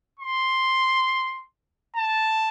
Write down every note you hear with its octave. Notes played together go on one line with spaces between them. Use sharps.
C6
A5